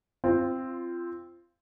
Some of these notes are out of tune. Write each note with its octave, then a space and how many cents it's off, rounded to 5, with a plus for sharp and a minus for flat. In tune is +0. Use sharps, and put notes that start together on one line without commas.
C4 +0 F4 -20